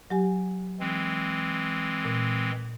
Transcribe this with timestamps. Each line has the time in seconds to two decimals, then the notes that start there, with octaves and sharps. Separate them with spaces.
0.10 F#3 G4 G#5
0.80 E3 G#3 C4
2.05 A#2